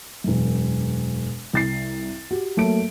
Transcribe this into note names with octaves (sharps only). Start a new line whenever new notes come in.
E1 F#2
C2 A6 C7
F#4 G4
F#3 A3 A#3 D7